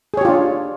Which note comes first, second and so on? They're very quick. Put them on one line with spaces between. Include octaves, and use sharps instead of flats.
G#4 C#5 G4 F4 D4